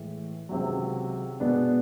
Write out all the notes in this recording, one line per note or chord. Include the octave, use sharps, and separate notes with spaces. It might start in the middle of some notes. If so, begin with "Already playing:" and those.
Already playing: A2 E3 G#3
C#2 C3 D#3 F#3
B2 G#3 B3 D4